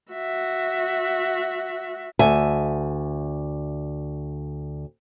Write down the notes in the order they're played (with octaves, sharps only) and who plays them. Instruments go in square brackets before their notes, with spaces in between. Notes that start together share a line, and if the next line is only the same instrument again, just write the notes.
[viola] F#4 E5
[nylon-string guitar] D2 E5 G#5